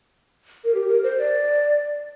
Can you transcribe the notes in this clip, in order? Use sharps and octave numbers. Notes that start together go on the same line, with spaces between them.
A#4
G4
A#4
C5
D5